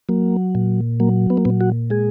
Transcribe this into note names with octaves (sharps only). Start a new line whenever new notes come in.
F#3 A#3
A#2
F#3 A#3
B3
A#3
A#2 B3
F#4
G#3 G#4